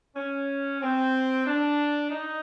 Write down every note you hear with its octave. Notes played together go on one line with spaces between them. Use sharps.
C#4
C4
D4
D#4